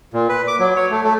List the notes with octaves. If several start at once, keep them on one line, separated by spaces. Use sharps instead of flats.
A#2
B4
D6
F#3
C#5
A3
A3